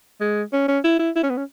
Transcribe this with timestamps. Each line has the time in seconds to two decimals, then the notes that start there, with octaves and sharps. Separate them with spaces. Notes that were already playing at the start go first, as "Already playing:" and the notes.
0.21 G#3
0.53 C#4
0.68 C#4
0.84 E4
0.99 E4
1.16 E4
1.23 C#4
1.30 B3
1.37 C#4